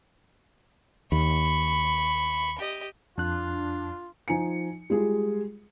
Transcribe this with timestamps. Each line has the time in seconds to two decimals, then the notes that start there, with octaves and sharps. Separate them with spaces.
1.12 D#2 B5 C#6
2.59 G4 D#5
3.18 F2 D4 F4 F#6
4.28 F3 D#4 G#5 C#7
4.90 G3 G#3 F4 G#4